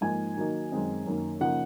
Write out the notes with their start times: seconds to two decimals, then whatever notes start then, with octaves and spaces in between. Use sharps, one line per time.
0.01 G#2 F3 A#3 D#4 G#5
0.36 D#3 F#3 A#3 D#4
0.72 F#2 D#3 G#3 C4 D#4
1.06 F#2 D#3 A#3
1.40 C#3 F3 A#3 D#4 F#5